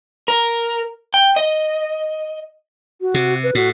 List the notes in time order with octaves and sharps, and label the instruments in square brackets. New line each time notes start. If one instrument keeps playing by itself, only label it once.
[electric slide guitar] A#4
G5
D#5
[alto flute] F#4
[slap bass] C3
[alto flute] B4
[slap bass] A2 [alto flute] F#4